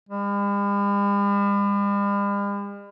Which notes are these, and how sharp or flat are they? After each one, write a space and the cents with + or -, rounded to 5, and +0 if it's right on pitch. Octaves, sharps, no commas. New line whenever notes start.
G3 +45